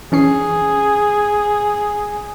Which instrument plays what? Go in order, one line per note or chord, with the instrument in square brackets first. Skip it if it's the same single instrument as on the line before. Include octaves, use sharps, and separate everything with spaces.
[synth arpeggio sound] E3 C#4 C7 [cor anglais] G#4